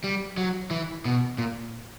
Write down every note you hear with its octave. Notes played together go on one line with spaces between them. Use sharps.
G3
F#3
E3
B2
A#2